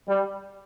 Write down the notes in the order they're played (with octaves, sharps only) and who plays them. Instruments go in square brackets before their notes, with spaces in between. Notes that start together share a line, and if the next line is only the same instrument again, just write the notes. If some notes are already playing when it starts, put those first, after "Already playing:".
[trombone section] G3